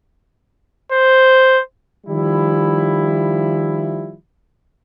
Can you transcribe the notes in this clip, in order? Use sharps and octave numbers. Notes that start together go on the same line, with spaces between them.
C5
D#3 F3 G3 E4